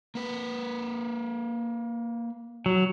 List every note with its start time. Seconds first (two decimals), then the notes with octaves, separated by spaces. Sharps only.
0.15 A#3 B4
2.66 F#3